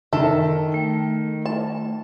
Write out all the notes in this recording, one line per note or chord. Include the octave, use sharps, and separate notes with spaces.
D#3 A4 E5
A3 G5
A5